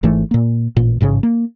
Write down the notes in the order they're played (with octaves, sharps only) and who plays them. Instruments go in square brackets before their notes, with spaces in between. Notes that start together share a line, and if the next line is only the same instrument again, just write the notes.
[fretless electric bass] G#1 G#2 E3 A3
A#2 A#3
A1 A#2
A1 G#2 C#3
A#3